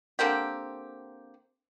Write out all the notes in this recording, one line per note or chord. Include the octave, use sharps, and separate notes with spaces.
D3 A#3 C4 G4